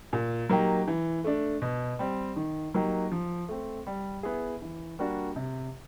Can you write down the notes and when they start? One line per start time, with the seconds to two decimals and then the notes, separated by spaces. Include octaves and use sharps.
0.13 A#2
0.49 F#3 A#3 D#4 G4
0.88 E3
1.24 A3 D4
1.62 B2
1.99 G3 C4
2.36 D#3
2.74 F#3 A#3 D#4 G4
3.12 F3
3.49 A3 C4
3.87 G3
4.23 B3 E4 G#4
4.62 E3
4.99 G3 A#3 D4 F#4
5.36 C3